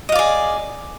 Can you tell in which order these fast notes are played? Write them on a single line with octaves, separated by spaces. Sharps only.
D#5 F5 D5 G#4